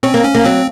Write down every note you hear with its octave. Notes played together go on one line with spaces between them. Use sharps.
C4 C#4
A#3
C#4
A#3
F#3 C4